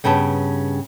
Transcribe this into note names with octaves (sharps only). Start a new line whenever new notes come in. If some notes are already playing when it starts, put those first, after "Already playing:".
G2 C#3 B3 G5 A5